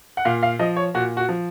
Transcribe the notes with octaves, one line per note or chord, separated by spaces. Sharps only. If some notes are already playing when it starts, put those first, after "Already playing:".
F#5
A#2 F5
F5
F3 D#5
C#5
A#2 F#4
F#4
F3